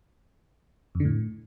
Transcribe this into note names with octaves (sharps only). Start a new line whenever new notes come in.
F2
D3
A2